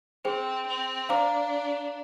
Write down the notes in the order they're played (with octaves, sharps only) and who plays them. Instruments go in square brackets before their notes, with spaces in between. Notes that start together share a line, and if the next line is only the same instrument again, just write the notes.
[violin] C4 [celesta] G#4 C5 G5
[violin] C4
[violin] D4 [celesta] C5 F5 A#5 D6